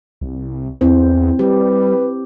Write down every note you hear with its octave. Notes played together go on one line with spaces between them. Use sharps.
C2
E2 C4 E4 C5
G3 G4 B4